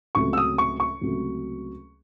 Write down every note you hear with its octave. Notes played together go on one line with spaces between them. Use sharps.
C#2 C3 F#3 A3 C#6
E6
D#6
C#6
C#6
C#2 C3 F#3 A3